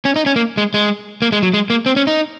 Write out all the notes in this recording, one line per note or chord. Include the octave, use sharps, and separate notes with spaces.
C#4
D#4
C#4
A#3
G#3
G#3
A#3
G#3
F#3
G#3
A#3
C4
C#4
D#4